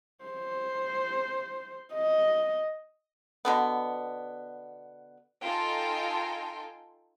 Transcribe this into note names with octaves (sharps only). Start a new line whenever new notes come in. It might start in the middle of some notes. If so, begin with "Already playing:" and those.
C5
D#5
B2 D3 B3
D#4 F4 A4 G5 G#5 C6